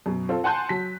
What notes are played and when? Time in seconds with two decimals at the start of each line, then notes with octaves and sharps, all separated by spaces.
0.06 F#2 B2
0.29 C4 F4 A4
0.44 F#5 G#5 A5 C6 F#6 G6
0.69 F#3 B6